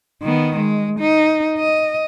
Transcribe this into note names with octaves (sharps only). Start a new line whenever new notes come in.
D#3 B3
G#3
D#4
D#5